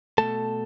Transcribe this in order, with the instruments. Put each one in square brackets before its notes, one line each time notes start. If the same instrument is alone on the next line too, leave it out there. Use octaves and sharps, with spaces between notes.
[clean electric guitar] B2 F#3 A3 A4 A5